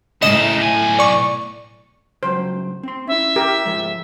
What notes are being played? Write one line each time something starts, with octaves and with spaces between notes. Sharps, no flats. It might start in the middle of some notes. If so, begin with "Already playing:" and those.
A2 C#3 D#4 D#5 E7
B1 G#5
D5 C#6
C#2 G2 F#3 C5
C4 C6
C#4 E4 E5
G4 A#4
G#2 F3 G#3